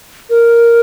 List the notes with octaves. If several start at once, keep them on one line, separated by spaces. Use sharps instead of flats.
A#4